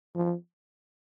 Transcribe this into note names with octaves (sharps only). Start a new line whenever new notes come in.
F3